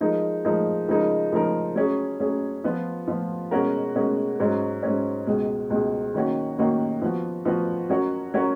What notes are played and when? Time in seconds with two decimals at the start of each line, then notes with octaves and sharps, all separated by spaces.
0.01 F3 G#3 D#4 A#4
0.45 F3 G#3 D#4 A#4
0.88 C#3 F3 G#3 D#4 A#4
1.32 C#3 F3 G#3 D#4 A#4
1.76 F#3 C#4 G#4
2.20 F#3 C#4 G#4
2.64 F3 B3 F4
3.08 F3 B3 F4
3.51 B2 G#3 C#4 F#4 A#4
3.95 B2 G#3 C#4 F#4 A#4
4.39 G#2 F#3 C#4
4.83 G#2 F#3 C#4
5.27 C#2 B2 G#3
5.70 C#2 B2 G#3
6.14 D#3 F#3 A#3 C#4 F#4
6.58 D#3 F#3 A#3 C#4 F#4
7.02 F3 B3 F#4
7.45 F3 B3 F#4
7.90 F#3 C#4 F#4 A#4 C#5
8.34 F#3 C#4 F#4 A#4 C#5